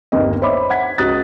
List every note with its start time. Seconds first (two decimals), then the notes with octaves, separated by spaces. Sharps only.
0.12 G1 D#2 A#3 C4 D#5
0.42 C5 C#5 E5 B5 D6
0.70 F#5 G#6 B6
0.98 C#2 F#4 D#6 F#6 A6